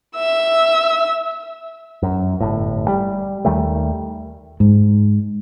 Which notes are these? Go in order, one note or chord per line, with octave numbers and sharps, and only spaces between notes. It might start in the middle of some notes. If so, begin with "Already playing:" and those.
E5 E6
F#2
G1 A2
G3
D#2 D#3 G3 A3
G#2